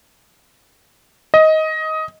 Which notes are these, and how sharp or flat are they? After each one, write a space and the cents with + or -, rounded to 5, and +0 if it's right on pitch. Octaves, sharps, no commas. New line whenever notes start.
D#5 +15